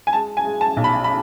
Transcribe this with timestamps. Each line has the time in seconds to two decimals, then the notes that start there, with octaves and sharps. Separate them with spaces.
0.07 G#5
0.13 G#3 A5
0.37 G#5
0.45 G#3
0.61 A5
0.77 B1
0.84 B5
1.04 B5